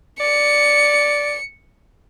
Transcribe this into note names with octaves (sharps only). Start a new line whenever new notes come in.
D5 C#7